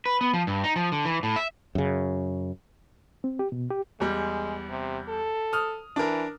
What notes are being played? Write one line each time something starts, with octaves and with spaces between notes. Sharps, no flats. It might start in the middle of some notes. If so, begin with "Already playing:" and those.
B4
B3
F3
G2
D#4
F3
D3
E3
A2
E5
F#2 C#3
C4
G4
B2
G4
E2 G3 G#3
C3
A4
D#6 F6
E3 D4 A#4